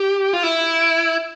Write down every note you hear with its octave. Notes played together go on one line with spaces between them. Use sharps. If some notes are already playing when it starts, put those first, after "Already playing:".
Already playing: G4
F4
E4